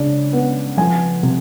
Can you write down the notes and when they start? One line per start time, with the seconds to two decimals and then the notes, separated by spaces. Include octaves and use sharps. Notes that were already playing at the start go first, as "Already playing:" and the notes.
Already playing: C#3 D4
0.33 B3
0.77 F3 G#5
1.23 C3